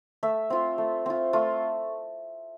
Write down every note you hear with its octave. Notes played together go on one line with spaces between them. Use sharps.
A3 E5
C4 F4
A3
C4 F4
A3 F4